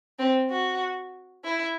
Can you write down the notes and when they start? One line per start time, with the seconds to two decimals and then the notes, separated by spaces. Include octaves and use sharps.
0.19 C4
0.50 F#4
1.44 E4